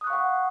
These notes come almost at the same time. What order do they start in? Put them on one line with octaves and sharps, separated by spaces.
D#6 F#6 C#6 F5 F#5